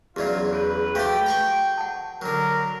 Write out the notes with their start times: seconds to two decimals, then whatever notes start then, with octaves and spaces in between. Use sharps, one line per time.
0.16 E2 C#3 F#3 F4 F#4 D5
0.53 G#4 B4 C#5
0.95 A3 F#4 G4 B4 F5 G5
1.26 A#5 C6 C#6
1.78 F#5 A5
2.22 D3 F#3 A#4